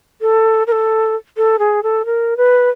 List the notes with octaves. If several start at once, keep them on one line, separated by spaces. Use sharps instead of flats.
A4
A#4
A4
A4
G#4
A4
A#4
B4